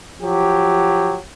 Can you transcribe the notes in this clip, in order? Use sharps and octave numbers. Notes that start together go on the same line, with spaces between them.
F3 F#3 G4